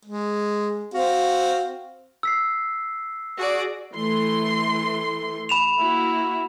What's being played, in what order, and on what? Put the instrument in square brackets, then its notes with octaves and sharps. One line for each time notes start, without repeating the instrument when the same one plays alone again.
[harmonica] G#3
C4 F#4 F5
[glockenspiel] E6 B6 C7
[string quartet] F#4 G#4 D5
[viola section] E3 A3 C6
[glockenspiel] B5 E7 F7
[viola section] A#3 E4 F#4